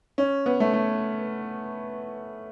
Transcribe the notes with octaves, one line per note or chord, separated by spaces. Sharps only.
C#4
B3
A3
A3